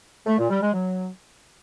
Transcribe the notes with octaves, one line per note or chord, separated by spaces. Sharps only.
A3
A#2
G3
G#3
F#3